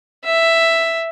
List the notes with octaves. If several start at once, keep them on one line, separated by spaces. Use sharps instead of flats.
E5